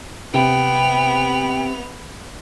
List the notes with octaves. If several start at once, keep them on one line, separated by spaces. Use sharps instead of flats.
C3 B3 G5 F7